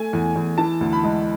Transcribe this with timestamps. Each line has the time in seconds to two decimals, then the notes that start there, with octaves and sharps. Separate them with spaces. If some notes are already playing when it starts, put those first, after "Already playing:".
Already playing: A3 G#5
0.13 E2
0.36 E2
0.58 E3 A5
0.81 D2
0.93 B5
1.03 G#3